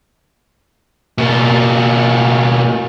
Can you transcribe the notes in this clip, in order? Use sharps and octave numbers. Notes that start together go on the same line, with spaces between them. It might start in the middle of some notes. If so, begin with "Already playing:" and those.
B2 A#3